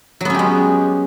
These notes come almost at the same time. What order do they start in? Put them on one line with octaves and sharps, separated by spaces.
F#3 B3 C#4 G4 G#3